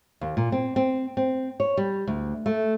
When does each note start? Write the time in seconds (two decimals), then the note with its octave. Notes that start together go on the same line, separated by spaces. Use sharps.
0.21 D#2
0.37 A#2
0.52 C4
0.76 C4
1.17 C4
1.60 C#5
1.77 G3
2.07 D2
2.46 A3